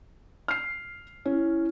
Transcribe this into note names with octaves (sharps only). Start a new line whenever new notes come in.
F6 C7
C#4 E4